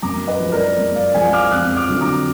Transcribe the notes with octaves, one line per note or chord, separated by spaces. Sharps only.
F#2 A#5 D6
B4 D#5
F3 G#3
A#4 D5
F#2
D5 F5
F3 G#3 F5 G#5
D6 F6
F2 D#6 F#6
D6 F6
D3 F#3
A#5 D6